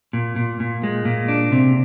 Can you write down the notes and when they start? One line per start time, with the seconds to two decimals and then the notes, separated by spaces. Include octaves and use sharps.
0.13 A#2
0.36 A#2
0.60 A#2
0.83 G#3
1.05 A#2
1.28 D4
1.52 C3